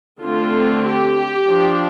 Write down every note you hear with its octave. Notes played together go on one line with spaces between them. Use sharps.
D3 A3 C4 F4
G4
F3 D4